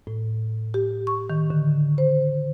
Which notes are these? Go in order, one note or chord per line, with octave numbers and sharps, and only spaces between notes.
A2
G4
C#6
D#3
D3
C5